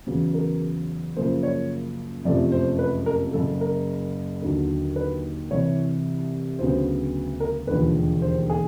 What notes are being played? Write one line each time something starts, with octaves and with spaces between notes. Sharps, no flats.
E2 C#3 F#3 B3
A#4
F#2 C#3 F3 A#3 C5
C#5
F#1 F2 C3 F3 A3 D5
C5
B4
A#4
F#1 F#2 C#3 A4
A#4
D#2 D3 F#3
B4
C2 C3 E3 C#5
D2 C#3 F#3 B3 C5
A#4
E1 D#2 D3 F3 B4
C5
G#4